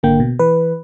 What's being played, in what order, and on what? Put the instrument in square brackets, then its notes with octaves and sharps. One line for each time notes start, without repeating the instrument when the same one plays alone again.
[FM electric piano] G#1 D3 A#3 G5
B2
E3 B4